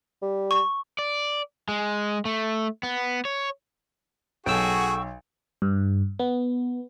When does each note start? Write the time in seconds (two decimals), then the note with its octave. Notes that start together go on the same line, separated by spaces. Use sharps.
0.22 G3
0.51 C#6
0.99 D5
1.69 G#3
2.25 A3
2.83 B3
3.25 C#5
4.46 B1 F#4 G#4 A4 F#5 G5 C#6 E6
5.62 G2
6.19 B3